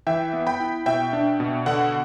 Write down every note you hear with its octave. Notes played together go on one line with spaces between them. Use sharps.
E3 E5 G5
B3
G5 B5
E4
B2 E5 G5
D4
B2
D3 F#5